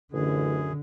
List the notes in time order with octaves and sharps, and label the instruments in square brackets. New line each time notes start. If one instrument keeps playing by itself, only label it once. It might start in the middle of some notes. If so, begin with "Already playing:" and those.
[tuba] A1 [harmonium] F#2 G#4 [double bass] D3